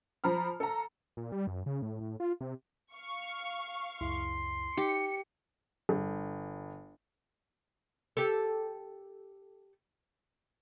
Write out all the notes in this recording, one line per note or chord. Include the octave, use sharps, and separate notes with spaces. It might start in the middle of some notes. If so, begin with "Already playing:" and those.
F3 A#5 B5 F6
A4 A#5
A#2
G3
F#2
C#3
A2
A2
F4
C3
F5 C#6
C#2 F#2 E4 C6
D#4 G4 C#7
G1
G4 A4